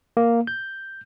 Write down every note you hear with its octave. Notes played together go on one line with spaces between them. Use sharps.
A#3
G6